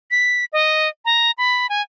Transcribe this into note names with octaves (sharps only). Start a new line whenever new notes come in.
B6
D#5
A#5
B5
G#5